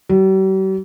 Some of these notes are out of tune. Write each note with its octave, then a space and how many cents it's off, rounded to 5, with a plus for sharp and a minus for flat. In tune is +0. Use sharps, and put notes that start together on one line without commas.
G3 -45